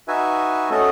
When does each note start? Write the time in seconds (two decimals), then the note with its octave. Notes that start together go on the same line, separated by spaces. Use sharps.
0.08 D#4 F#4 B4 E5 G#5
0.70 A3 C#4 F#4 A4 D#5